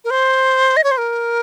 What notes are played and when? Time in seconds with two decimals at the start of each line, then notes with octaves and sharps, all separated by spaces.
0.05 A#4
0.11 C5
0.77 D#5
0.84 C#5
0.91 C5
0.98 A#4